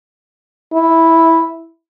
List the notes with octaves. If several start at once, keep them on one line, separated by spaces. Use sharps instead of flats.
E4